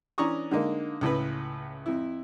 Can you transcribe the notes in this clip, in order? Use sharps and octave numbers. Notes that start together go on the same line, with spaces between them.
E3 C#4 D4 A#5 C#6 D#6
D3 G#3 A#3 D#4
C#2 A2 C#3 B4
F2 E4